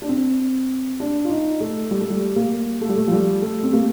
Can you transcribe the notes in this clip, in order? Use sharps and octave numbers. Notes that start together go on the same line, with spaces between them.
D4
C4
D4
F4
D#4
A3
G3
A3
G3
A#3
A3
G3
A3
F3
G3
A3
C4
A#3